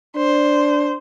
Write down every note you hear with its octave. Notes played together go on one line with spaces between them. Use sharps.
D4 C5